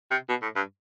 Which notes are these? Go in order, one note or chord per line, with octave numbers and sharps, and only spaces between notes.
C3
B2
A2
G2